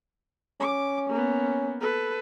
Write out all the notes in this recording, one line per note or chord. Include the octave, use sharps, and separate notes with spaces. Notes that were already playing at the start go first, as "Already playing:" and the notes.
C#4 D6
A#3 B3
A4 B4